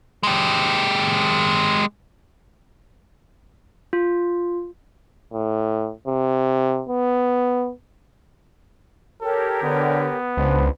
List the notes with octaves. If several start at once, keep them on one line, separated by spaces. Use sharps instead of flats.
G#3 G4
F4
A2
C3
B3
G4 A4 A#4 C#5
D3 B3
C#2 D4 B4 C5